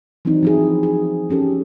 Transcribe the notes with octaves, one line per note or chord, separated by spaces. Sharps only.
E3 F#3 C4 D4 D#4
F3 E4 G#4
G#4
F3 C#4 G4 A4